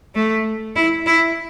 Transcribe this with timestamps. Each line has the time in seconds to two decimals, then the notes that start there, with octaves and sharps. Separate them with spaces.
0.15 A3
0.76 E4
1.06 E4